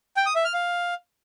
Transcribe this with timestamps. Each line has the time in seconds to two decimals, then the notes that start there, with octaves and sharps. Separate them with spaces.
0.17 G5
0.26 D#6
0.35 E5
0.45 F6
0.54 F5